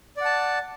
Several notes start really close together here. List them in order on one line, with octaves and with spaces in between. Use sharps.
D5 F#5 A5